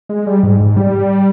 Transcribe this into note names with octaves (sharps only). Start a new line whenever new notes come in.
G#3
G3
G#2
G#2
G3